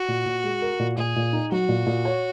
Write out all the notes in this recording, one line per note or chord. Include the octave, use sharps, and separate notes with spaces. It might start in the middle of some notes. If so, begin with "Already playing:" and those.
Already playing: F#4
A#2
A#2
G#3
A#4
A#2
A#2 G#4
A#2
D#4
F#3 F#4
A#2
A#2
C#5